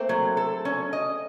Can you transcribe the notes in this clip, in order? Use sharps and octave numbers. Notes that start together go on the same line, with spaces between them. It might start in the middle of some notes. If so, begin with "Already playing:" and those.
Already playing: A3 A#3 C4
F#3
A4
C#4
D#5